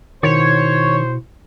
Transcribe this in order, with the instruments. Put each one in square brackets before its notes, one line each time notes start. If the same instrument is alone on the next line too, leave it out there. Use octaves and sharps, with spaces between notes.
[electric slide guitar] B2 E4 F#4 [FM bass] D#3 [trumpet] C5 [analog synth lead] C#5